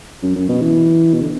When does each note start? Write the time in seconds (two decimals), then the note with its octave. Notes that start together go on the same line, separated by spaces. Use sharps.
0.23 F#2
0.35 F#2
0.49 B2
0.61 E3
1.14 B2
1.22 D3